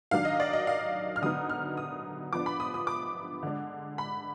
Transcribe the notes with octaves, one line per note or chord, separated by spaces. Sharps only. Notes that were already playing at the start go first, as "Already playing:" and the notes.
D#3 F#3 D4 F5
D#5
D5
D#5
F5
F6
D3 F#3 B3 D#4 D#6
F6
D#6
F3 B3 D4 D6
B5
D#6
D#6
D6
D3 G#3 D4
B5